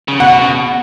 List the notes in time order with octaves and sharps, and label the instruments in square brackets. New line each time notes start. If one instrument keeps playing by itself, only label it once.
[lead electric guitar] C#3
[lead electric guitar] B2 [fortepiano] F#5